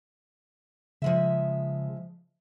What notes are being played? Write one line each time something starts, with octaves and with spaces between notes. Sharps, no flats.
C#3 F3 G#3 E5